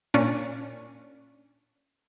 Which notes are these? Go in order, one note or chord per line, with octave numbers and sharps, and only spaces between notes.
A#2 C#4 D4